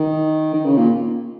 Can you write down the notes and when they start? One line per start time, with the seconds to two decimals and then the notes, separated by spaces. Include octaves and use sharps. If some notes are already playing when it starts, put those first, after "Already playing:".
Already playing: D#3
0.54 D#3
0.65 C#3
0.78 A#2